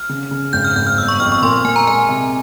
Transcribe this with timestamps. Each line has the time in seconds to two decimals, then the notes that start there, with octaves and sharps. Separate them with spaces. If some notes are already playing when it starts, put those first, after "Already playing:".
Already playing: F6
0.09 C#3
0.31 C#3
0.53 G#1 G6
0.65 F6
0.76 G#1 G6
0.86 F6
0.97 G1 E6
1.08 C#6
1.20 F2 F6
1.32 C#6
1.42 A#2 C6
1.64 A#2 G#5
1.76 A#5
1.87 G#3 G#5
2.09 C3